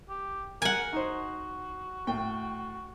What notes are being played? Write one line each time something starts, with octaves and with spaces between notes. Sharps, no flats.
G4
A#4 F#5 G#5
D#4 F#4 C5
A2 G5